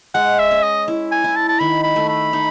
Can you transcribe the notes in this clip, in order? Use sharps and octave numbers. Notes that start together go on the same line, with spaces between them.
G#3 F#5
E5
C#4
D#5
E4
G#5
E4
A5
A5
D#3 B5
B5
A3
B5
D#4